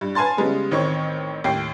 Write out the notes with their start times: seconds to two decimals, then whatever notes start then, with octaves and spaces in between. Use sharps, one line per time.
0.01 G2
0.15 B4 F5 G#5 A5 C6 A6
0.37 C#3 G3 G#3 B3
0.71 A1 D#3 C4 C#5 C#6
1.44 D#2 A2 G5 C7